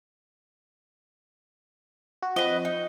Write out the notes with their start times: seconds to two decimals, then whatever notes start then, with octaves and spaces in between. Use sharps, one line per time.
2.22 F#4
2.36 F3 C4 B4 D#5
2.65 D#4